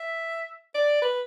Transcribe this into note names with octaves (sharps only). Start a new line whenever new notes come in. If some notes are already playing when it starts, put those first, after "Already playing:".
Already playing: E5
D5
B4